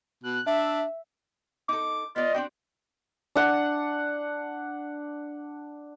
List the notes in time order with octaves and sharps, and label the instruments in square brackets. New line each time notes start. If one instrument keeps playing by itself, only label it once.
[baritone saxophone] B2 [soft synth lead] F#6
[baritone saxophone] D4 [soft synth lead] E5
[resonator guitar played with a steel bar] D#4 A4 [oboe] D6
[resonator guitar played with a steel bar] B3 D5 [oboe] F4 [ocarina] D#5
[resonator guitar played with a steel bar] C4 D4 F#4 [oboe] G5
[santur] D4 F#5